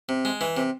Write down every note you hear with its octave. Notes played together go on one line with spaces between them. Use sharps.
C3
G#3
E3
C3